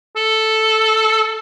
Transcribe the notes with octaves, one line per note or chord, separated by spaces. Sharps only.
A4